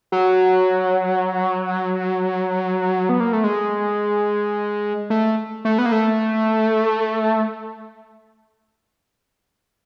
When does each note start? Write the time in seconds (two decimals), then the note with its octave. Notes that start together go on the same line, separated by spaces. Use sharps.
0.12 F#3
3.09 B3
3.20 A#3
3.33 A3
3.44 G#3
5.10 A3
5.65 A3
5.78 B3
5.86 A#3
5.92 A3